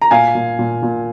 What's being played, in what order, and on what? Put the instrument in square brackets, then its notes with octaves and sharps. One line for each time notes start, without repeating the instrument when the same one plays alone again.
[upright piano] A#5
A#2 F5 G#5
A#2
A#2
A#2